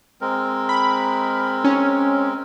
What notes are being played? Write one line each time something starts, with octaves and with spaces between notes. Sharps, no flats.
G#3 C4 A#4
B5
C#4